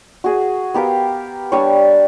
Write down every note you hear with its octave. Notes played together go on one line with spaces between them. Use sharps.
F#4 G#4
B3 G4 A#4 F5
G3 D4 C#5